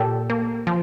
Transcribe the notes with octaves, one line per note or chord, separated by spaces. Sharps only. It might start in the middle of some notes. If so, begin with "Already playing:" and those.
Already playing: A#2 G4 A4
A#3
F3